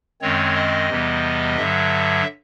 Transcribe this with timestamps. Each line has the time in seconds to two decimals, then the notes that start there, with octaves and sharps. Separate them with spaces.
0.22 F#2 D#3 G#3 C4 C#5
0.56 D#5
0.89 E2 C3 E3 G3 B3
1.57 G2 D3 F#3 E5